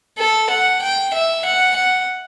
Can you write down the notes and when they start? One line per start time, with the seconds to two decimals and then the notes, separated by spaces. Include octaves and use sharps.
0.18 A4
0.50 F#5
0.82 G5
1.13 E5
1.45 F#5
1.76 F#5